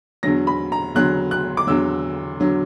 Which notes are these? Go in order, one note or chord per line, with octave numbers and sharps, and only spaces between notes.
E2 D3 F#3 A#6
B5
A#5
E2 D3 F#3 F#6
F#6
D6
E2 D3 F#3 E6
D3 F#3